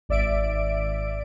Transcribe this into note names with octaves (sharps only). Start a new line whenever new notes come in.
G#1 D5 E5 D7